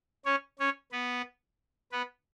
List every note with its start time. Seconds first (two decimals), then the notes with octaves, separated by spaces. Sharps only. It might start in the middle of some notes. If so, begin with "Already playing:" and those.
0.25 C#4 C#5
0.59 C#4 C#5
0.92 B3 B4
1.92 B3 B4